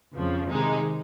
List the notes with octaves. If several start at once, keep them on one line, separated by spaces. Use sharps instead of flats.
F2 C#3 F3
C3 D#3 G#3 D#4